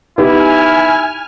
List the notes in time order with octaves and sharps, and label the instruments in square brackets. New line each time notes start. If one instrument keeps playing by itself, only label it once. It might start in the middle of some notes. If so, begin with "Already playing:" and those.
[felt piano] B3 D#4 G4 [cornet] E4 [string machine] G#5 F6